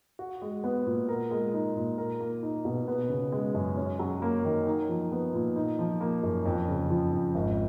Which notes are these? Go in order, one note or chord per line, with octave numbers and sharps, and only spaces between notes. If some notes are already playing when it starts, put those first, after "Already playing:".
F#4
G#3
B3
A#2
A#4
G#3
D#4
A#2
A#4
A#3
D#4
B2
B3
C#3
G#3
F#2
C#4
F#3
A#3
D#3
D#4
F3
B3
A#2
D#4
F3
A#3
F#2
F2
C#3
F3
F2
G#1